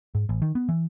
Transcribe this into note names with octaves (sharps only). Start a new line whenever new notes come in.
G#2
A1
D#3
B3
E3